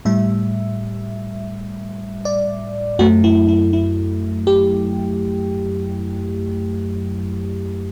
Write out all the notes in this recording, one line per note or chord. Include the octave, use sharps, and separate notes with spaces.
A2 G3 E5
D5
F#2 F#3 A3 F#4
E4
E4
E4
G4